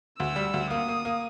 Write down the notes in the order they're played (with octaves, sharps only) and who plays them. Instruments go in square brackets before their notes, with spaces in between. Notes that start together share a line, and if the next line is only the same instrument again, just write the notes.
[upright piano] D2 [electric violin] E6
[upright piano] G3
D2
[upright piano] A#3 [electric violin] D#6
[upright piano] A#3
A#3